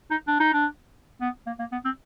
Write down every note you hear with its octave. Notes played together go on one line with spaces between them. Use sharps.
D#4
D4
D#4
D4
B3
A#3
A#3
B3
C4